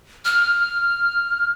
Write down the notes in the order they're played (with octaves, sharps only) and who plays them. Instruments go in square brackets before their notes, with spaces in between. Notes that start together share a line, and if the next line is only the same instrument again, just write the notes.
[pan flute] F6